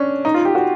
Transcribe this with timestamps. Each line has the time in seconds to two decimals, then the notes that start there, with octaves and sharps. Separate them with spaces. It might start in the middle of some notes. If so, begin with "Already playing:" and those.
Already playing: C#4 D4
0.25 D#4
0.34 F4
0.45 G4
0.55 F#4